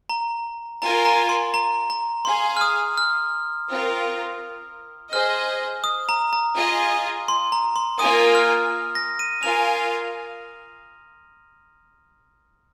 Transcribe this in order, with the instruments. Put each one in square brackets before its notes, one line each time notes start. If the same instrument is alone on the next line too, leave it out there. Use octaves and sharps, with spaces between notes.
[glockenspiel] A#5
[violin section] F4 A#4 G#5 [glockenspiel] A#5
[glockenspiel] A#5
C6
A#5
A#5
[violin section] G#4 F5 G#5 [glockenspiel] C6
[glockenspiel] F6
D#6
F6
[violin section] C4 F4 A#4
[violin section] G#4 C5 D#5 [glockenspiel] F6
[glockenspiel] D#6
A#5
A#5
[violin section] F4 G#4 D#5 G#5
[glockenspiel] C6
A#5
C6
[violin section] A#3 F4 A#4 G#5 [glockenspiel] D#6
[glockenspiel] F6
A#6
D#7
[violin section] F4 A#4 F5 G#5 [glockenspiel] F7